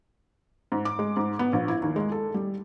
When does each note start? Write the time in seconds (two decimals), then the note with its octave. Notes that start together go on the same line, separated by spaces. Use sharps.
0.72 G#2
0.85 D6
0.99 G#3
1.17 G#2
1.39 B3
1.53 A#1
1.68 E4
1.82 D#2
1.96 G#3
2.12 A4
2.34 G3